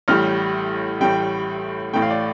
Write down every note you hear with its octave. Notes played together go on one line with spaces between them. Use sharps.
A1 A2 G3 F6
A1 A2 G3 G5
A1 A2 A3 G5
F5
D5